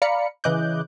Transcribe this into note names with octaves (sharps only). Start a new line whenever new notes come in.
D5 F5 A#5 B5 C#7
C#3 E3 D#5 D6 F#6 G6